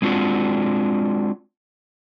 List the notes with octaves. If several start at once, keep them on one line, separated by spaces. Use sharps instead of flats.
G#3 C4 D4 F4 F#4